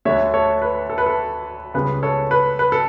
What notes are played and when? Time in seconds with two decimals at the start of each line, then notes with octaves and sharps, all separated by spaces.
0.05 D2 D3 A3 C#5 E5
0.34 A4 C#5
0.62 B4
0.90 A4
0.98 B4
1.06 A4
1.74 C#2 C#3 G3 B3 B4
2.03 A4 C#5
2.31 B4
2.59 B4
2.72 A4